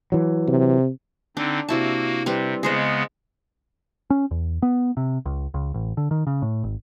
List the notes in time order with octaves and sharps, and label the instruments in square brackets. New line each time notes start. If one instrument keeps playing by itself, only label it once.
[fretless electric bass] E3 F#3
[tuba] C3
[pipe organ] D3 C4 D#4 [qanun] D4
[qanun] C3 E4 A5 [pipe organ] A#3 F#4
[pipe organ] C3 [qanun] G3 C4 B4
[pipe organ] C#3 G#3 B3 [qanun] G#4 C5 D#5
[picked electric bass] C#4
E2
B3
C3
C#2
C#2
A1
D3
D#3
C#3
A2
G#1